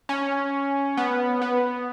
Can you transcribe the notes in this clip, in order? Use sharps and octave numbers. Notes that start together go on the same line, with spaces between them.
C#4
B3
B3